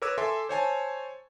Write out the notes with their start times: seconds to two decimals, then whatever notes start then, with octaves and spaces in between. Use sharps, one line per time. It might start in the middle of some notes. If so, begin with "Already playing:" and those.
0.02 A#4 B4 C#5 D6 E6 G#6
0.18 A4 E5 G#5 C6 D6
0.49 C5 C#5 G#5 A5